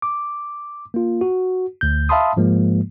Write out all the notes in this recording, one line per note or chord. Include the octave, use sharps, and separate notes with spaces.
D6
A#3 F4
F#4
D2 G6
E5 F5 A5 B5 C6 D#6
G#2 F3 G#3 A#3